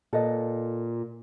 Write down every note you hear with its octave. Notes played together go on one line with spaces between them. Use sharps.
A#2 A4 B4 D#5